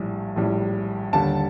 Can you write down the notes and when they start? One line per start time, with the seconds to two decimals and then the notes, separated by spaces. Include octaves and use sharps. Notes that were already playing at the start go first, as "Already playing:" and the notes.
Already playing: A#1 A2 G3
0.36 A#1 A2 G3
1.13 D#2 D3 G3 A5